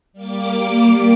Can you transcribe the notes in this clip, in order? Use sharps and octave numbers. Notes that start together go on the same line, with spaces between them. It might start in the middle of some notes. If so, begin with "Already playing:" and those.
G3 A#3 D6